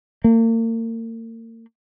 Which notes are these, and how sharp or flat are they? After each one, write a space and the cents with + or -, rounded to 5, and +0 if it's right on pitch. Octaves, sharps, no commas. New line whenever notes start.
A#3 -40